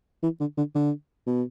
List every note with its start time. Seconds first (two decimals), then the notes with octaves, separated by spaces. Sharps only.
0.23 E3
0.40 D3
0.57 D3
0.75 D3
1.27 B2